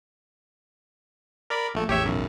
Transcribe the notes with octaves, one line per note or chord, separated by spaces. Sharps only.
A#4 D5 B5
A#1 A3
A1 E2 G4 C#5 E5
B1 F#2